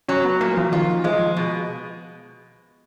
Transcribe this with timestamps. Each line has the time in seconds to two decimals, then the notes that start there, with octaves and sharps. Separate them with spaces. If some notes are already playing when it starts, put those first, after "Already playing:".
0.09 F#3 C#4
0.25 B3
0.40 A#2 A#3
0.57 F3
0.72 D#3 F4
1.04 F3 G#3
1.37 B2